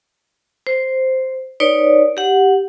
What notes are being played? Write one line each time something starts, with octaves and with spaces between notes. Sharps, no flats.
C5
D#4 B4 C#5 D5
G4 F#5